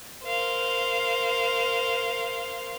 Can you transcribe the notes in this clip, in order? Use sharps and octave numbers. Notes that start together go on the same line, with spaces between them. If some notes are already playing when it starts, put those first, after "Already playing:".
A#4 C5 F5